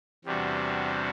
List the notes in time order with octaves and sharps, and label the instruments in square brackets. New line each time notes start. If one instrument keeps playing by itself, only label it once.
[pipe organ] E2 C3 G3 D4 F#4